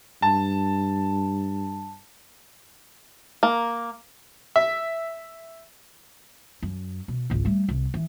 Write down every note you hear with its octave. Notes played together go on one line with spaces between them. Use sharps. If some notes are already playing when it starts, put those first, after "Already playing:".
G2 A5
A#3
E5
F#2
B2
G#1 C#2
G3 A3
C2
E3